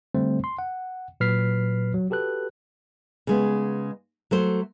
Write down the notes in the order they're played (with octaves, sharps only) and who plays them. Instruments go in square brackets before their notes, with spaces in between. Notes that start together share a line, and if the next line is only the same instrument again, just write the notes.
[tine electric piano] D3 G3 A3 C4 C5
C6
F#5
A#2 F#3 B4 F6 B6 C7
F#3
F#4 G4 A4 B4 F#6
[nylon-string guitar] C#3 G#3 B3
F#3 A3 C5